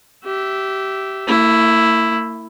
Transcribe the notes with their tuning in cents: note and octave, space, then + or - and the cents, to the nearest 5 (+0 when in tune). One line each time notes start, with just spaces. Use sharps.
G4 -20 E5 +0
A#3 -45 E4 +0